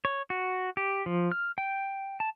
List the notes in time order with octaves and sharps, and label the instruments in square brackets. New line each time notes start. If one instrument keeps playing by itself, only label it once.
[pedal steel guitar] C#5
F#4
G4
F3
F6
G5
A5